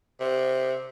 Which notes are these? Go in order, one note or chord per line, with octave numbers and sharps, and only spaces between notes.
C3